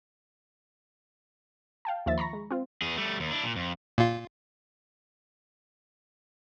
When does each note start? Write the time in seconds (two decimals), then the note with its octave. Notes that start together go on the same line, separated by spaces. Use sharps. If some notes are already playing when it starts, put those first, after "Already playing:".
1.85 F5 G5 A5
2.06 D#2 F3 E5 A6
2.18 A#5 B5 C#6 A#6
2.33 G#3
2.51 C4 F4
2.82 E2 G#4
2.97 G3 A3
3.20 D#2
3.31 D4 E4
3.44 A#2
3.56 F2
3.98 A#2 F4